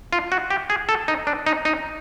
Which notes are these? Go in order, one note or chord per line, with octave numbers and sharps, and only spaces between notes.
F4
F#4
G4
G#4
A4
D#4
D4
D#4
D#4